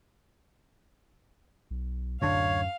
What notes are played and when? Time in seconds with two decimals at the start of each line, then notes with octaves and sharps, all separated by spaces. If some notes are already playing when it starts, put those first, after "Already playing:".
1.71 B1
2.22 D1 F#2 D3 D4 C#5 F5